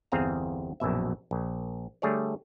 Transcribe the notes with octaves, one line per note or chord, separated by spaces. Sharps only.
G1 E2 C4 G#4 F5 A#5
A#1 F#2 B2 E5
A#1
D3 G3 A3 G#4 C#5 D5